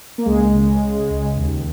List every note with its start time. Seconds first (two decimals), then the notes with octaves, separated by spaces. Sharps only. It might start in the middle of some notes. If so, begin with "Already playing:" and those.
0.18 A#3
0.26 C#2 G#3
0.54 C#3
0.82 C#3
1.10 C#2
1.37 D#2